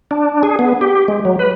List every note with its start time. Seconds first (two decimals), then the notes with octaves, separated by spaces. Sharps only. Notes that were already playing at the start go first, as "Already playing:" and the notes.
0.11 D4
0.43 G#4
0.59 B3
0.81 G4
1.08 G#3
1.25 F#3
1.39 B4